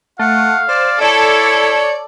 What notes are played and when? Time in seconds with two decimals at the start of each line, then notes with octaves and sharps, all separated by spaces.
0.19 A3 F5 F#5
0.69 C5 D5
1.01 E4 A4 C#5 D5